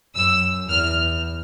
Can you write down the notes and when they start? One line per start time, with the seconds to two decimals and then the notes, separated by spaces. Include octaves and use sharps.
0.15 F#2 E6
0.69 E2 F6